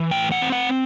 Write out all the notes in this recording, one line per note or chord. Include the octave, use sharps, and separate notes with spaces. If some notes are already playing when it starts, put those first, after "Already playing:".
Already playing: E3
A2 G5
F#5
C4
F#5